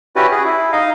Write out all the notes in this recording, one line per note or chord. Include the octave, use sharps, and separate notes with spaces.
C#4 E4 F#4 G4 B4 D5
G#4
E4
D#4 D#5 F5